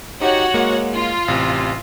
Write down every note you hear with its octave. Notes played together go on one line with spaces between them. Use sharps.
D#4 F#4 G4 C#5 F#5
G#3 A#3
F4
A1 C3